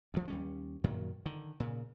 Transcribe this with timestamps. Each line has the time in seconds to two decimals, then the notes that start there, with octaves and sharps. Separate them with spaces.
0.14 D2 F3
0.28 D#2 G3 C#4
0.84 F#2 A#2 D#3 F#3
1.26 D3 D#3
1.60 A#2 C#3